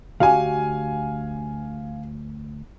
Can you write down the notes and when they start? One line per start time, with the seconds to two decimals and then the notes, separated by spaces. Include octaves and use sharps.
0.20 D2 F#4 G4 F5 G#5